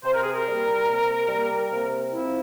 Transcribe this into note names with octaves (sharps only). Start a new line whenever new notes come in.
C3 C5
A#4
G#4
A#4
G3 A#3
C3
G3 A#3
C3
F3 C4 E4